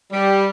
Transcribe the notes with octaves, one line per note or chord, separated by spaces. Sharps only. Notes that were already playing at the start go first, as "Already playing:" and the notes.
G3